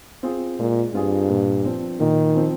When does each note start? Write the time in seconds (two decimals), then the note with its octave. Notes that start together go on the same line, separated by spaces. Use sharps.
0.23 C4 F4 G#4
0.59 A#2 G#3
0.93 G2 C4 F4 G#4
1.29 A#2
1.65 F3 C4
1.99 A#2 D#3
2.34 F3 C4